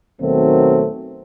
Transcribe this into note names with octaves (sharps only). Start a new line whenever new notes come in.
D#2 B2 D#3 F#3 A3 C4